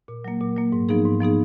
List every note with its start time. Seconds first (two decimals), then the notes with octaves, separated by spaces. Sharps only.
0.08 A#2
0.25 F#3 A#3
0.41 A#2
0.57 F#3 A#3
0.72 G#2
0.89 F3 B3 D#4 G#4
1.05 G#2
1.20 F3 B3 D#4 G#4